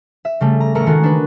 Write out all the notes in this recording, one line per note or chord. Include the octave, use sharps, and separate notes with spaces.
E5
C#3 G3 A3
A#5
A1 A3 A4 A#4 A#5 C#7
D#3 G#3 F#4 A#4
D4 B4